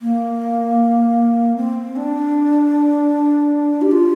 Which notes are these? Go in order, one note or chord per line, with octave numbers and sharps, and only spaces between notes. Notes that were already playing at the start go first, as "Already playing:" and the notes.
A#3
C4
D4
G4
F4